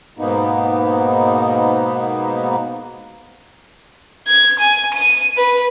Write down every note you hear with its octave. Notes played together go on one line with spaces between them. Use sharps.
G#2 B2 A#3 B3 D#4
G#6
G#5
D#7
B4